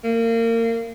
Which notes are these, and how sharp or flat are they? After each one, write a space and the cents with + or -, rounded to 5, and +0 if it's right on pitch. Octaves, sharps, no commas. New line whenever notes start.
A#3 -30